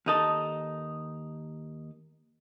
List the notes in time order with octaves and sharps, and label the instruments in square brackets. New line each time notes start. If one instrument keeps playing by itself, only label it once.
[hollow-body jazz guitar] D#2 D#4 A4